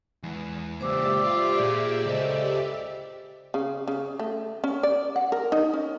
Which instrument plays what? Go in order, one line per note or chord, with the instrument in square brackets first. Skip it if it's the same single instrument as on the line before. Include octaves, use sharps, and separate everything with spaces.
[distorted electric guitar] E2 E3 [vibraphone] G#3
[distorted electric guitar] C#2 A#2 [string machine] G4 D5 E5 [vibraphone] C5 D6 E6
[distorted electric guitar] F4
[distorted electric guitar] A#2 [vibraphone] G#4
[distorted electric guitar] C#2 [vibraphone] A4 C5 D#5
[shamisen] C#3
C#3
A3
C#4
D5
F#5
A#4
D#4
C#4